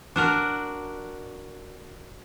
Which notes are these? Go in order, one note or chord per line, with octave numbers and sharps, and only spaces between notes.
D4 F#4 A#4